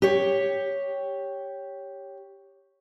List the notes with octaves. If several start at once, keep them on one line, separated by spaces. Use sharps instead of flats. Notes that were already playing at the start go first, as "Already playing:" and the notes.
G4 C#5